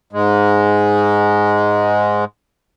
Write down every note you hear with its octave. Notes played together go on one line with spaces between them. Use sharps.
G#2 G#3